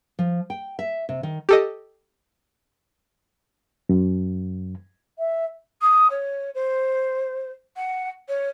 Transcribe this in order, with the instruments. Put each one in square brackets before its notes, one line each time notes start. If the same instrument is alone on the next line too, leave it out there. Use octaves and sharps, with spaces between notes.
[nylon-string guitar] F3
G5
E5
C3
D#3
[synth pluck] G4 A4 D#5
[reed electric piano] F#2
[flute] E5
D#6
C#5
C5
F#5
C#5